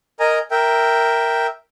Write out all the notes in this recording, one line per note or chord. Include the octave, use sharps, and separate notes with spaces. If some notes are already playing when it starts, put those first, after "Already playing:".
A#4 D#5 G#5 A#5
A#4 E5 G5